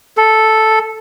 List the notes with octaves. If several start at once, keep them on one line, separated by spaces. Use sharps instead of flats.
A4